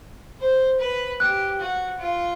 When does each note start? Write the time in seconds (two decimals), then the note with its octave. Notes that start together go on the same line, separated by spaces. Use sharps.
0.40 C5
0.80 B4
1.20 G4 F#6
1.60 F#4
2.00 F4